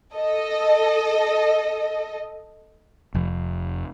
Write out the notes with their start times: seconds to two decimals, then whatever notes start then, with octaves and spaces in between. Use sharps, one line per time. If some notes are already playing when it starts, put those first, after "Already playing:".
0.14 A4 D#5
3.15 F1 F2